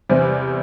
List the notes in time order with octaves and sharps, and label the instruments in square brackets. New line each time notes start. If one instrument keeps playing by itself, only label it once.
[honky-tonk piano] E2 C3 G3 C4